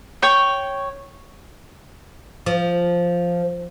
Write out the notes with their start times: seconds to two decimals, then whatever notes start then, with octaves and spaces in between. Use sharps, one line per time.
0.22 C#5 G5 C#6
2.46 F3